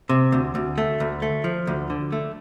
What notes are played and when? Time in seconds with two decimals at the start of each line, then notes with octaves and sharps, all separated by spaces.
0.09 C3
0.32 D2
0.55 D2
0.78 A3
1.00 D2
1.22 A3
1.44 F3
1.67 D2
1.90 D3
2.12 A3